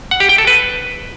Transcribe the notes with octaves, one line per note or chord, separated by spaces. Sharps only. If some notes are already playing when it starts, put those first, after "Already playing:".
F#5
G4
G5
A4
B4